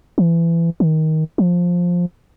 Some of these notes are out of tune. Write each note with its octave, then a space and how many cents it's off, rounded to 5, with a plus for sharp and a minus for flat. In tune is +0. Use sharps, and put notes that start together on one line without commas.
E3 +25
D#3 +15
F3 +10